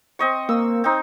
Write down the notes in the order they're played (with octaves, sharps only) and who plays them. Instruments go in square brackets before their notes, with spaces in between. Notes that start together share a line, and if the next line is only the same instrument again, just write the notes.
[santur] C4 D#5 C#6
[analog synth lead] A#3 [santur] E6
[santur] C4 D#4